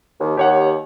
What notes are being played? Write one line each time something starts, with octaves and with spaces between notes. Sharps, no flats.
D#2
D#2 G4 C#5 F#5